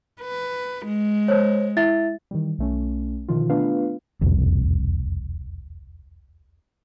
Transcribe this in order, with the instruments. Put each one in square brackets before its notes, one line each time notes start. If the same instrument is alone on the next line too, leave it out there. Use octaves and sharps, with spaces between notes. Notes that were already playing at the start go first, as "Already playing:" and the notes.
[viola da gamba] B4
G#3
[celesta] C5 C#5
E4 E5 A6
[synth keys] D#3 E3 G3
B1 A3 C#4
B2 D3 D#3 F3 F4
A3 B3 D4 F4 B4 F5
[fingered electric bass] E1 C2 F2